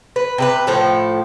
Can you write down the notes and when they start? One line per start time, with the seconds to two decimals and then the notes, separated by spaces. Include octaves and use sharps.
0.16 B4
0.38 C3 G#4 B4
0.67 A2 F3 A4